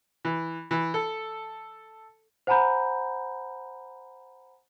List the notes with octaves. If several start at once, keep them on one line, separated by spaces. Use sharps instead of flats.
E3
E3
A4
C5 F#5 G#5 A#5 B5 G6